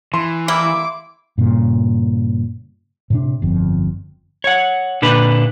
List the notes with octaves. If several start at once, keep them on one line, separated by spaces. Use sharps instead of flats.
E3 C6
G3 A#3 E4 D6
G2 A#2 C#3
A2 C3 D4
G1 F2
C#5 F#5
A#2 D3 D4 B4